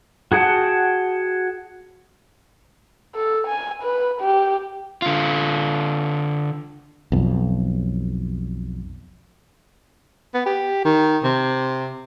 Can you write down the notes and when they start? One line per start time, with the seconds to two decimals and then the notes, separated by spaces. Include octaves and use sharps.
0.32 F#4 G#4 F#5 G5 A5
3.15 A4
3.47 G#5
3.82 B4
4.21 G4
5.02 D3 F4
7.12 B1 F2
10.34 B3
10.46 G4
10.85 D#3
11.24 C3